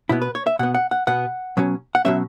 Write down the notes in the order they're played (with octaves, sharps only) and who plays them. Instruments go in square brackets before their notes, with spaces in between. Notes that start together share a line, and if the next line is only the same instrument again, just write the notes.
[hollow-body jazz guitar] B2 B3 E4
B4
C#5
E5
B2 B3 F#5
F#5
F#5
B2 B3 F#5
B2 F#3 C#4
F#5
B2 F#3 C#4 E5